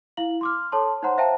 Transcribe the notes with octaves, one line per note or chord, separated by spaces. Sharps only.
E4 F5 F#7
C6 D6 F6
A4 C#5 A5 C6
D#4 C5 C#5 F#5 A#5 C6
C5 E5 F5 G5 A5 A#5